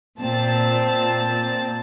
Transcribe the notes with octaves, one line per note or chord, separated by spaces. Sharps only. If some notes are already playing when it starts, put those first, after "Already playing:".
A#2 C4 A5